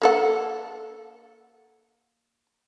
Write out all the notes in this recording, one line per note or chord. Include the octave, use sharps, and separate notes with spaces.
A#3 A4 F#5